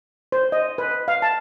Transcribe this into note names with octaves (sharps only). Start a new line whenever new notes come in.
C5
D#5
B4
F5
A5